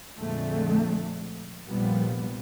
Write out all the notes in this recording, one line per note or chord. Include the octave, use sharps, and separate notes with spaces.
F2 A#2 D3 G#3 A3
F1 A#1 A#2 F3 G3 B3